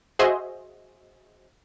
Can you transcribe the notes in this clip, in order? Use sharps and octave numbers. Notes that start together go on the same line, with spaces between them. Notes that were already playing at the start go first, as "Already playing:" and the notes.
F#4 G#4 C5 D#5 E5